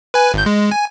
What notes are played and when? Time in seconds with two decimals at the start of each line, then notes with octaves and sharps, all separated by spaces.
0.14 B4 G#5
0.34 G#1 G6
0.46 G#3
0.71 G#5